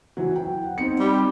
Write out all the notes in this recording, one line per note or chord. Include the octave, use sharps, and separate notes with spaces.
E3 F#3
G5
F#5
C4 D#4 C#7
G3